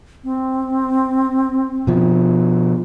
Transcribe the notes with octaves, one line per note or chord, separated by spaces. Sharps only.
C4
B2 F3